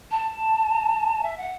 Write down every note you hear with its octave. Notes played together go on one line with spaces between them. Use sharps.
A5
E5
F#5